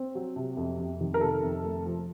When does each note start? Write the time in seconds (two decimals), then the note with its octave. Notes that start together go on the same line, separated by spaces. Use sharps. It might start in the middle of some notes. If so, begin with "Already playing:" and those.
Already playing: C4
0.15 F#3
0.36 C3
0.57 F2
0.79 F2
1.01 D#3
1.14 A#4
1.21 C3 A4
1.43 F2
1.64 A3
1.86 F3